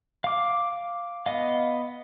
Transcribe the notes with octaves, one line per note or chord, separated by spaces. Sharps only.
F5 D6
B3 D#5 F5